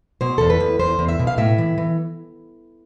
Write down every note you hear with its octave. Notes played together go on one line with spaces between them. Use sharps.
B2 C5
E2 A4
B4
E2
E2 C5
E2
E5
B2
F5
A2 E5
E3
E3